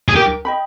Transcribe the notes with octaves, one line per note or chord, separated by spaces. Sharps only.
G#4
G4 A#4
D#5 G5 B5